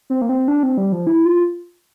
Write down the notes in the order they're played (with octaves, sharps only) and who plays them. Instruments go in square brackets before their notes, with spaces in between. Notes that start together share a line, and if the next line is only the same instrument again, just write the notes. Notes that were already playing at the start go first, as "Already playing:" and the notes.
[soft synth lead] C4
A#3
C4
D4
C4
G3
F3
E4
F4